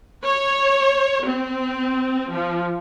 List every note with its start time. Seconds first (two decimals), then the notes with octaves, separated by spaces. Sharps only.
0.23 C#5
1.23 C4
2.30 F3